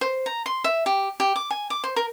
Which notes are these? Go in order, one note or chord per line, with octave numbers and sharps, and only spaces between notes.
C5
A#5
C6
E5
G4
G4
D6
G#5
D6
C5
A#4